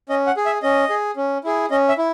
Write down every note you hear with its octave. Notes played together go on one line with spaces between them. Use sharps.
C#4 D#5
F#5
G#4
E5
C#4 D#5
G#4
C#4
E4 G#4
C#4 D#5
E5
E4